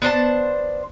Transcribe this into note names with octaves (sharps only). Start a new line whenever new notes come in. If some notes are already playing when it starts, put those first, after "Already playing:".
B3 D4 C5 A5